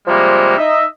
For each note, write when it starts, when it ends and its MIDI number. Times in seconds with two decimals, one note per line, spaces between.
0.07 0.57 48
0.07 0.57 53
0.07 0.57 55
0.07 0.57 56
0.07 0.57 58
0.57 0.84 63
0.57 0.84 75
0.57 0.84 76